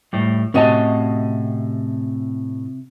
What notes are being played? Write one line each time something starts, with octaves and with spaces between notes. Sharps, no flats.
A2 G3
A2 C3 C#4 F#4 D#5 A5